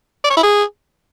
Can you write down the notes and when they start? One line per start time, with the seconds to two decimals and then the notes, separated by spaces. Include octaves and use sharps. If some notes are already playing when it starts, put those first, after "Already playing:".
0.24 D5
0.30 C#5
0.37 E4
0.43 G#4